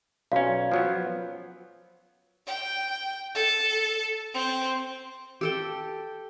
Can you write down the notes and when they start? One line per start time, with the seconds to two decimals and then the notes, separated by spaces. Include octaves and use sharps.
0.32 B1 C#4 F#4 D5 F5
0.71 F3 F#3 B3
2.47 G5
3.35 A4
4.34 C4
5.41 G4 A4 G5